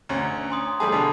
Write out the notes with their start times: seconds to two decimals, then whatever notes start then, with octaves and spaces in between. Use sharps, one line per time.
0.09 D2 C#4 A#5
0.50 G#5 C6 D#6
0.80 G3 A3 G#4 A5 D#6
0.92 B2 D3